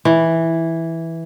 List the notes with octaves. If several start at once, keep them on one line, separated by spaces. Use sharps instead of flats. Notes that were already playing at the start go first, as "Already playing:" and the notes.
E3